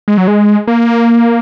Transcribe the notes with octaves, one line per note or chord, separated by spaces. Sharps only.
G#3
F#3
G#3
A#3